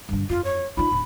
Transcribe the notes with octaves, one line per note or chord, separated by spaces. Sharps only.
G2 D3
F2 F4
C#5
D#4 F4 B5
D1